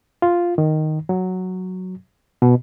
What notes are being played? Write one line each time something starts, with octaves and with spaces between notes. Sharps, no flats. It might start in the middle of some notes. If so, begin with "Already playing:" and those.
F4
D#3
F#3
B2